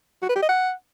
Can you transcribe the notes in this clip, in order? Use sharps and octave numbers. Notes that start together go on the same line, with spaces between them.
F#4
B4
G4
D#5
F#5